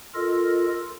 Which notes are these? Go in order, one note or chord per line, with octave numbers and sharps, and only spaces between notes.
F4 A4 A#4 D#5